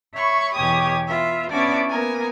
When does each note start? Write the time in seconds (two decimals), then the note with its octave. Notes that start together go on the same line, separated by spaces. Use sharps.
0.14 C#5 E5 B5 C#6
0.55 E2 B2 G4 C#5 G#5 D#6
1.07 B3 F4 E5
1.49 B3 C#4 D4 E4 F#4 D5
1.89 A#3 B3 A#4 G#5